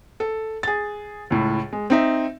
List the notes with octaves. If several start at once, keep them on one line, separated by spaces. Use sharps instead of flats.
A4
G#4 A6
C#2 A2
G#3
C4 D#4 E5